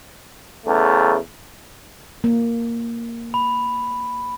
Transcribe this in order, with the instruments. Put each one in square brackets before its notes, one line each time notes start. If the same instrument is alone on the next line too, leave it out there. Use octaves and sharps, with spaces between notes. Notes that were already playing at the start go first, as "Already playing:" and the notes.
[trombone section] E2 C#3 A3
[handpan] A#3
[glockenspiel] B5